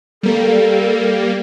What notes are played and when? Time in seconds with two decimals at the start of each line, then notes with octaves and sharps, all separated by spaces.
0.23 G3 A#3 A4